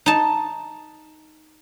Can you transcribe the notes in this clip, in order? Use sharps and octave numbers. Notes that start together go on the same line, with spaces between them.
D#4 A5